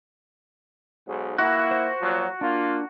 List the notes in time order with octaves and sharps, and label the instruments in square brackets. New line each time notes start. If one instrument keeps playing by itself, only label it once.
[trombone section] B1 G#2
[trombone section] A#3 E4 [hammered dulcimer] F#4 [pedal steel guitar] F#6
[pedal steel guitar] C5
[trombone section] A#2 F3 F#3
[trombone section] A#3 F4 [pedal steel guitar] D4